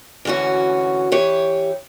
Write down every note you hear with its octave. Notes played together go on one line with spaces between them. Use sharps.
D2 G#2 E3 C#4 F#4
E3 G4 C#5